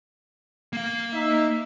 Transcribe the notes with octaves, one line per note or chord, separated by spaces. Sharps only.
A#3 F5
D#4 E5